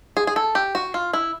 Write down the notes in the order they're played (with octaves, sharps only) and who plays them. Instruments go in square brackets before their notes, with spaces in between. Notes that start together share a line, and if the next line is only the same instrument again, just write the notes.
[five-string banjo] G#4
G#4
A4
G4
F#4
F4
E4